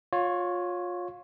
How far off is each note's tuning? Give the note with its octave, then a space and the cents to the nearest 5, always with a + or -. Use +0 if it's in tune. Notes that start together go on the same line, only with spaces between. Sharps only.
F4 +25 C#5 +0